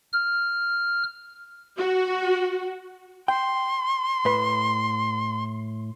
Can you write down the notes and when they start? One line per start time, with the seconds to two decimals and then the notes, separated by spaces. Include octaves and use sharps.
0.13 F6
1.77 F#4
3.28 G5 C6
4.25 A2 B4